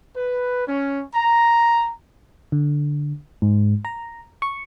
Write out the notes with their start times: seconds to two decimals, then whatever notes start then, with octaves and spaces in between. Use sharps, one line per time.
0.15 B4
0.66 C#4
1.14 A#5
2.52 D3
3.42 G#2
3.85 A#5
4.42 C#6